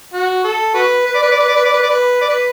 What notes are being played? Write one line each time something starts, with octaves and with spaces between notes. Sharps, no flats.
F#4
A4
F#4 B4
B4
D5
B4
D5
B4
D5
B4
D5
B4
D5
B4
D5
B4